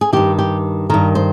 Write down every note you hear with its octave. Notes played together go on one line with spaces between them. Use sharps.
G#4
G2 D#3 G4
G4
G2 D#3 A#4
C5